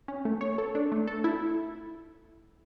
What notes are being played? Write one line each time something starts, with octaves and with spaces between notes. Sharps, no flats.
C#4
A3
C#5
A4
D4
A3
A4
E4